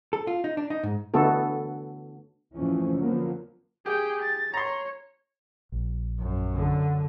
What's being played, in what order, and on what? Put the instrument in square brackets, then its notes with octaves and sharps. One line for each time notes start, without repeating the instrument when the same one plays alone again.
[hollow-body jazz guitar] A4
F4
D#4
D4
D#4
G#2
[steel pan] D3 A3 B3 F#4 A4
[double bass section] F2 A2 E3 F3 A3 C#4
D3 F3 F#3 A#3 B3
[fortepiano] G4 [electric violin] G#4 G5
[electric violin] A6
[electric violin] C#5 [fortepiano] A#5 C6
[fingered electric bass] A#1
[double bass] F#2
[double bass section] D3